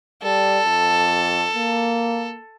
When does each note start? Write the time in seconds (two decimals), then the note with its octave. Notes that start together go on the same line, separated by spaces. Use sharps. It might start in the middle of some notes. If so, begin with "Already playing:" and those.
0.23 G3 A4
0.65 F2
1.55 A#3